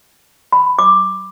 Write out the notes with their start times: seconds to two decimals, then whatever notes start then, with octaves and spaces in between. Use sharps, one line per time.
0.52 B5
0.79 D6